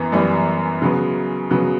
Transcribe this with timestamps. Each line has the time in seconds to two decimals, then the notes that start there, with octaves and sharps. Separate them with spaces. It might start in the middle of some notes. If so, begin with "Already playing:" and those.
Already playing: F#2 E3 B3 A#5
0.12 F#2 E3 G3 B3
0.82 C#3 F#3 B3
1.51 C#3 F#3 B3